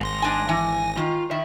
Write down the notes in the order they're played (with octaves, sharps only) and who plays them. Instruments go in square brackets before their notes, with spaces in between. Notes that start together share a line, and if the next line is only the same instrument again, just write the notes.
[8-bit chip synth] G#1 A#6 [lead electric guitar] G#2 C6
[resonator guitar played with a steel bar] D4 G#5
[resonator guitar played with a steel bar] E3 [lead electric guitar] G#5
[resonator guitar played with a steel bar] D#3 [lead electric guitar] F4
[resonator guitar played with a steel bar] D#3 [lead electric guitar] E4 E5